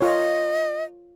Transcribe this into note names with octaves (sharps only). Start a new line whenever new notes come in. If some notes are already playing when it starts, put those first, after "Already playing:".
F4 A#4 C#5 D#5